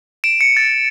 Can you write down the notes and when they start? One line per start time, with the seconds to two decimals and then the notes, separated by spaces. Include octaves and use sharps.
0.24 D7 E7
0.41 C#7
0.57 A6